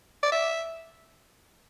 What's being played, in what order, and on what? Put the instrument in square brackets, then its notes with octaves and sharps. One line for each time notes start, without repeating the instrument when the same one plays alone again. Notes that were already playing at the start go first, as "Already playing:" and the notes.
[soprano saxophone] D5
E5